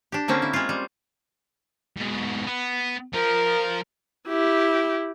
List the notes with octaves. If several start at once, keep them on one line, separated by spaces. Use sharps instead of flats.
D4 G4
D3 A#3 C4 C#4
E4
G#3 F4
G3
G#2 B2
B3
F3 A#4
E4 G4